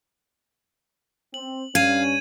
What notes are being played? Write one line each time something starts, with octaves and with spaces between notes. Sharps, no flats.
C4 F#7
G2 C#4 F5 G#6 D#7